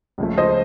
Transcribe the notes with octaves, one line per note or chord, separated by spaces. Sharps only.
C#2 C#3 F3 A3
C5 D#5